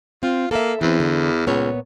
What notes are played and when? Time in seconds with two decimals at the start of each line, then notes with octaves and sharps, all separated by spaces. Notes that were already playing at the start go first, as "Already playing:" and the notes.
0.23 C4 F4
0.51 A#3 A4 E5
0.81 E2 E3 C4
1.00 D3
1.47 C#2 A#2 B3 C#5